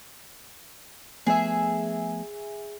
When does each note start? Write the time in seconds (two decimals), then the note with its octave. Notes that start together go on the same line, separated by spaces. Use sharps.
1.27 F3 A3 B3 G#4 E5